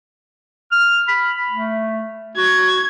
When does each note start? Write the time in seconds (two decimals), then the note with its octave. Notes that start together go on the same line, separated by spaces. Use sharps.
0.72 F6
1.08 B5
1.50 A3
2.37 F#4 G#6